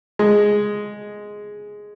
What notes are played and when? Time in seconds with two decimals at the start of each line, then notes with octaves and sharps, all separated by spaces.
0.19 G#3